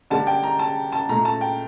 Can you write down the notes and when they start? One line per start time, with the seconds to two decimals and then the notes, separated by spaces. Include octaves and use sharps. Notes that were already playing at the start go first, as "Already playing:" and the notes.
0.10 D3 G3 A#3 A5
0.27 G5
0.43 A#5
0.59 A5
0.92 A5
1.09 A#2 A3 A#5
1.25 A5
1.41 G5